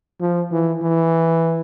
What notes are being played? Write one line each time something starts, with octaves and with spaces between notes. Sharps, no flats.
F3
E3
E3